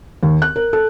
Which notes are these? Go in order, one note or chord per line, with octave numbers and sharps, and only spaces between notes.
D#2
F#6
A#4
A4